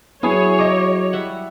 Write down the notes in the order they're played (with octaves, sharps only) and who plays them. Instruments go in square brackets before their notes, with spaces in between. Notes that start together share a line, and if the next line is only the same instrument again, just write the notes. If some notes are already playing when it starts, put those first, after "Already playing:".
[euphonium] F#3 [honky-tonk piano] B3 G#4 G#5 [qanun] E4 [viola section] C#5
[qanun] G#4 A#5 [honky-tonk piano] D#5 D6
[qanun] G3 E5 F#5